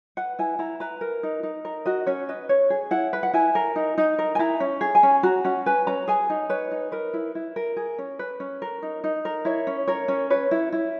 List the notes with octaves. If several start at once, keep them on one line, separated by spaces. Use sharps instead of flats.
B4 F#5
E4 G#5
E4 A#5
B4 A#5
A#4
D#4
D#4
A#4
F#4 D#5
C#4 C#5
B4 D#5
C#4 C#5
G#4
E4 F#5
B4
F#5
E4 G#5
A#4
D#4
D#4
A#4
G#5
E4 A#5
C#4
G#4
G#5
C#4
F#4 A#5
C#4 F#5
B4 G#5
C#4 A#5
G#4 G#5
D#4
B4 C#5
D#4
A#4 B4
E4
E4
A#4
G#4
C#4
B4
C#4
A#4
D#4
D#4
A#4
E4 C#5
C#4
A#4 C#5
C#4
B4 C#5
E4
E4